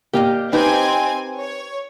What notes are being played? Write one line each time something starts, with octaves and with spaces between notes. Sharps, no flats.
A#2 G4 D#5 F5 G5
C4 D#4 G4 B4 C5 G#5
C#5